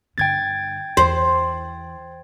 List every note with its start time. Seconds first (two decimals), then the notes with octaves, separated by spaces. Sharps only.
0.18 G2 D3 G5 G#6 A6
0.97 E2 C5